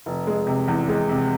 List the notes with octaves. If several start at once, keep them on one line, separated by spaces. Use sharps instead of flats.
F1
G#3
C3
E2
G#3
C3